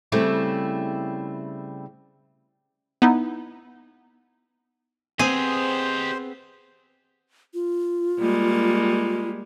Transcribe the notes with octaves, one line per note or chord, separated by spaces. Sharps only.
C#3 G3 A3 C4 E4
B3 D#4 E4
B3 C4 G4 G#4 C5 D#5
F4
G3 G#3 A#3